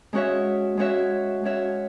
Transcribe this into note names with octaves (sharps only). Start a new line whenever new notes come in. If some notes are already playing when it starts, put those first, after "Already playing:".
G#3 C#4 F#4 C#5 E5
G#3 C#4 F#4 C#5 E5
G#3 C#4 F#4 C#5 E5